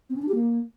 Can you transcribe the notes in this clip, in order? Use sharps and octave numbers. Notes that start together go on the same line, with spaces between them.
C4
C#4
D4
G4
A#3